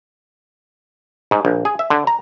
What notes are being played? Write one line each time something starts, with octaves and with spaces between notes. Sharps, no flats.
G#2
A#1
G#4
E5
D3
A#5